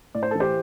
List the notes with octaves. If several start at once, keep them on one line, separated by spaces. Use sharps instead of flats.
A2 D5
C5
A4
E3
G4 C5